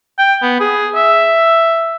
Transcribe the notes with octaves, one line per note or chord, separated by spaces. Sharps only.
G5
B3
G#4
E5